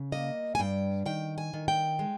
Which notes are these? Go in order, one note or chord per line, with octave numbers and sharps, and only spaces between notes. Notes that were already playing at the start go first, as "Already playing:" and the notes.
Already playing: C#3
A#3 D#5
G#5
G2 G5
D#3 G5
G#5
D#3
G5
G#3